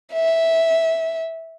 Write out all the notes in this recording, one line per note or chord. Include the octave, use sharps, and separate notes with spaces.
E5